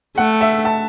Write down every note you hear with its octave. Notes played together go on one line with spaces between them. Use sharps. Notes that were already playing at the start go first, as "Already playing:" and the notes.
A3 F#5
E5
A5